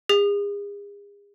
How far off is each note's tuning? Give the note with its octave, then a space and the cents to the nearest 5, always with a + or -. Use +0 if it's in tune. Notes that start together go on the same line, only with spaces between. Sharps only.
G#4 -40